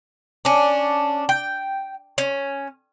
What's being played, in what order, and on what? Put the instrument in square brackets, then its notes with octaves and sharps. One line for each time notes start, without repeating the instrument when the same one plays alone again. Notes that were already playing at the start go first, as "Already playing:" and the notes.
[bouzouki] C#4 D4
G5
C#4